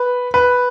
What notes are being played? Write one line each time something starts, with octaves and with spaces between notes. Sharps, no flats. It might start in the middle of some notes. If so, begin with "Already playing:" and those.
Already playing: B4
B4